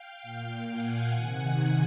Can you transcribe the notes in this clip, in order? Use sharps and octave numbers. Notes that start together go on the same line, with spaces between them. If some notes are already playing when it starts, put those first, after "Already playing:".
Already playing: F5 G5
A#2
F#5 G#5
C3 D#3